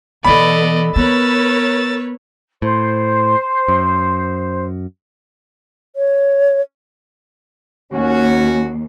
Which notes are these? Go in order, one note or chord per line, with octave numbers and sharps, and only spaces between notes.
B2 E3 B3 A4 D5 D#5 B5
B3 A#4 B4 C#5 E6 A6
A2 C5
F#2
C#5
D#2 C#4 F#4